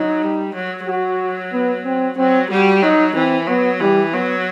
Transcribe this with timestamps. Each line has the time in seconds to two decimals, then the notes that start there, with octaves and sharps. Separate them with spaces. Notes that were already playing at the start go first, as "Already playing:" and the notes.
Already playing: F#3 D#4
0.22 G3
0.55 F#3
0.87 F#3 F#4
1.52 B3
1.85 C4
2.17 F#3 C4
2.50 G3 F#4
2.83 F#3 D#4
3.15 E3 C4
3.48 F#3 B3
3.80 E3 G3
4.13 F#3 B3